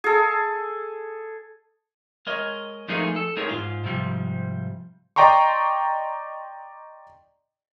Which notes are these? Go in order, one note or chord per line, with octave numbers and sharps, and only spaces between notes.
G#4 A4
G#3 A#4 C#5 D#5
F3 G#3 A3 D#4 G#4 A#4
A4
G#3 D#4 G#4 A#4 C#5
G#2 D#3 F4
G#2 C3 F3 G3
D5 D#5 G5 A#5 C6 C#6